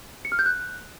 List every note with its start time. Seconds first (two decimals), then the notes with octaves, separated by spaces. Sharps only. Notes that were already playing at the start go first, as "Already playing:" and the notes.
0.25 C#7
0.32 F6
0.39 G6
0.46 F#6